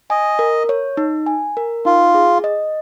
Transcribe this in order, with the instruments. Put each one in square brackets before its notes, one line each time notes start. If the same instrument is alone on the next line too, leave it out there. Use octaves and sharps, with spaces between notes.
[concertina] D#5 [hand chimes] G#5
[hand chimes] A#4
C#5
D#4
G#5
A#4
[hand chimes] D#4 [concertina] F4
[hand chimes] G#4
D#5